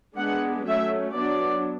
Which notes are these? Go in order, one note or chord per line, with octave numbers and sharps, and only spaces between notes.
G#3 B3 D4 F#5
F#3 A3 C#4 E5
F#3 B3 D4 D5